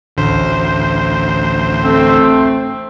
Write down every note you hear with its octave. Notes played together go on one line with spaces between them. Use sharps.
A1 D2 C5
A3 C4